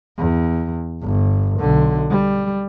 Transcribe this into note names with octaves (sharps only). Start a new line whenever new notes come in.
E2
G1
B1 D3
G3